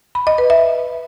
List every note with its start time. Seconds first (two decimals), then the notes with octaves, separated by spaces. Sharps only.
0.15 B5
0.27 D#5
0.38 B4
0.50 E5